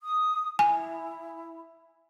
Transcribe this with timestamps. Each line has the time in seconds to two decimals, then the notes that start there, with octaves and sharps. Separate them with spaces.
0.01 D#6
0.59 E4 G#5